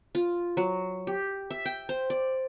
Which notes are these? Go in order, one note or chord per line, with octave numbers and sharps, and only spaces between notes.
F4
F#3
G4
E5
G5
C5
D5